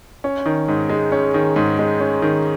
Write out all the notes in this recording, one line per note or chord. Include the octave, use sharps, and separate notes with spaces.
C#4
D#3
G#2
G#3
C#4
D#3
G#2
G#3
C#4
D#3